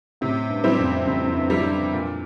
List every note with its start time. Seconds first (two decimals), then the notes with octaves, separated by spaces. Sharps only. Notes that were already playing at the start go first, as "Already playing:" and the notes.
0.21 A2 C3
0.49 G2
0.64 G3 C4 E4
0.79 F2
1.07 F2 C3
1.27 F2
1.36 G2
1.50 G3 C4 E4
1.65 G2
1.94 A#2